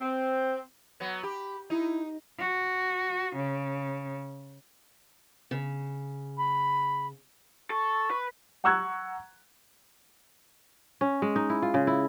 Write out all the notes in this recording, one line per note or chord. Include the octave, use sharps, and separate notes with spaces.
C4
F#3 B3
G4 B5
D#4 E4
F#4
C#3
C#3
B5
A4 C#6
B4
F#5 A#5 C#6 E6 F#6 G#6
C#4
G#3
D#4
E4
F4
C#3
E4